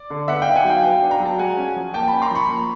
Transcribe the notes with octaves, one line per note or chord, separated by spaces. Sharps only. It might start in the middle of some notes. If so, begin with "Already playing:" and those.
Already playing: D5
D3
B3 E5 F#5
D#4 F5 G5
F#5 G#5
F#3
F5 G5
B3 F5 G5
D4
A#5
F#3
A5
G#3 F#5 G#5
C#4
F3
A#3 G5 A5
C#4 A5 B5
A#5 C6
F3 B5 C#6
A#3